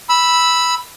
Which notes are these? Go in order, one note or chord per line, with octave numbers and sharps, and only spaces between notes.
B5 E6